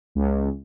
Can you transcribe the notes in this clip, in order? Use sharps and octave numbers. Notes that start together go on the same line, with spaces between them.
C#2